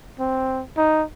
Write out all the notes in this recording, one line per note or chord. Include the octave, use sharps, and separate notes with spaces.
C4
D#4